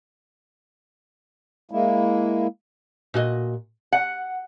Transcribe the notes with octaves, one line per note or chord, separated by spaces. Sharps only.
G#3 A#3 E4
A#2 F#4 D#5
F#5